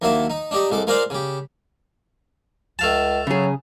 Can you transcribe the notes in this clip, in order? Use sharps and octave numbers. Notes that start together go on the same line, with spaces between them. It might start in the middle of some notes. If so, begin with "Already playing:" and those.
D#2 F#3 A#3 E4 E5 A5
D#4
D4 D#4 G4 D#5
C2 G#3 A4 D6
G#3 F4 A#4 C5 D5 F5
C#3 G4
C#2 A3 F5 A5
C#3 F#3 G#4